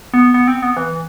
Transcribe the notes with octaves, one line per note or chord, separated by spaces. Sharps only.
B3
B3
C4
B3
E3